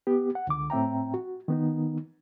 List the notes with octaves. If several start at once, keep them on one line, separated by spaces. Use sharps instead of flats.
B3 G4
F#5
C#2 D3 D6
A2 C4 E5 G5 A#5
F#4
D#3 B3 D#4